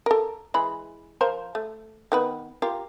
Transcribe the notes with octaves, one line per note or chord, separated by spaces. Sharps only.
A4 A#4
E3 G#3 B5
F3 A#4 C5
A3
D#3 B3 B4
F4 G4 A#4